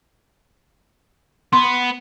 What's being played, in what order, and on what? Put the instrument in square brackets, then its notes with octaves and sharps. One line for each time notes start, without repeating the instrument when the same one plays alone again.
[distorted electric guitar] B3 [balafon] C6